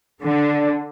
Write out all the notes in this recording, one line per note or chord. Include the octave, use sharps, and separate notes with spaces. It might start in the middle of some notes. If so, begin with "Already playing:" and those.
D3